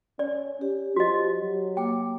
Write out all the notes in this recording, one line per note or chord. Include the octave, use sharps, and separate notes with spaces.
C#4 D5
C#4 G4
F3 F#4 D#5
F#3
A#3 G5 D6